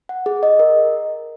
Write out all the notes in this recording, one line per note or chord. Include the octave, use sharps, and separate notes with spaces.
F#5
G#4
D#5
A#4